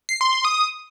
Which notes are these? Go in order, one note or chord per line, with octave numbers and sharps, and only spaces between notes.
C7
C6
C6
D#6